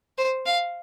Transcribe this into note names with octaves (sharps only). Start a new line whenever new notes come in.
C5
F5